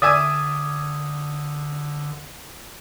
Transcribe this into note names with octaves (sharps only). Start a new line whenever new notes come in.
D3 D5 E5 G#5 D#6